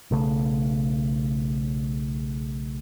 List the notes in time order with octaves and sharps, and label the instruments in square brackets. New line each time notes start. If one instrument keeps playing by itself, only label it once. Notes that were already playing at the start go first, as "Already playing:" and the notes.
[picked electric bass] B1 C#3 A3